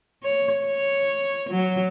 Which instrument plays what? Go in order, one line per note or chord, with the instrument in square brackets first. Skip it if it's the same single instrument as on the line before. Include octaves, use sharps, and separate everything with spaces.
[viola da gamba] C#5
C#5
F#3